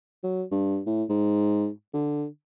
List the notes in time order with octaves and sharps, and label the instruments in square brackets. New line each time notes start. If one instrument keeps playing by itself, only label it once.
[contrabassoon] F#3
G2
A2
G#2
D3